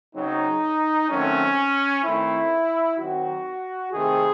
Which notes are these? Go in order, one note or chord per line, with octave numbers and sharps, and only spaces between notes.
C#3 F#3 C4 D#4
D#3 F#3 A3 C4 C#4
D#3 A3 C4 E4
D#3 F#3 C4 F#4
C3 D#3 A3 C4 G#4